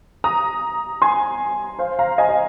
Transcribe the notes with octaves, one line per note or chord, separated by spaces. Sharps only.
A#5 D#6
G#5 C6
C5 F5
F5 A#5
D#5 G#5
D#5